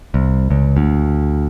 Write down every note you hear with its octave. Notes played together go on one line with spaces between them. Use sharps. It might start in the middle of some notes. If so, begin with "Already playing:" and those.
C2
C#2
D2